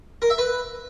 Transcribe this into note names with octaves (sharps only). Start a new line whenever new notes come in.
A#4
E5
B4